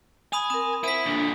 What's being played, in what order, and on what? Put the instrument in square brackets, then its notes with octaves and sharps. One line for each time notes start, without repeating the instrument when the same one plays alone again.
[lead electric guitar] G#5 [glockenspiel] B5 D#6 F7
[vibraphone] C4 A#4 [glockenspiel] D#6
[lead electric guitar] E4 [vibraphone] C5 F#5 [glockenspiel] B6 D#7
[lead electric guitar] A#2 D3 [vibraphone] D4